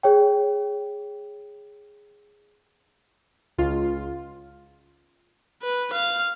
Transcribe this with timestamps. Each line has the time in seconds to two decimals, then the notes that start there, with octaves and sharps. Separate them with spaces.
0.03 G#4 C#5 G5
3.58 C#2 F4
5.63 B4
5.93 F5